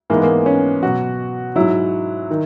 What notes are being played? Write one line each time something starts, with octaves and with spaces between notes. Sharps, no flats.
G#2 E3 G#3 A#3
B3
A#3
C#4
B2 F#3 F#4
G#2 F#3 E4
D#3